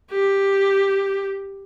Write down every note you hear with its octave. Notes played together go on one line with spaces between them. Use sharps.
G4